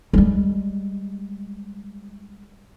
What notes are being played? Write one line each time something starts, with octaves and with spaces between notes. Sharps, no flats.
G3 G#3